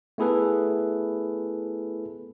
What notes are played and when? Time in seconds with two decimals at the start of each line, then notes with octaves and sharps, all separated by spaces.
0.18 A3 B3 E4 G#4 A4 B4